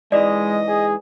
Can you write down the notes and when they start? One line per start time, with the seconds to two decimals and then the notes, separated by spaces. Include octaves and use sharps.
0.12 G#2 E3 G#3 D5 D#5
0.68 G#4